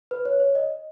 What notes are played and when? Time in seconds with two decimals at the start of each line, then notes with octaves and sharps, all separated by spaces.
0.11 B4
0.25 C#5
0.40 C#5
0.55 D#5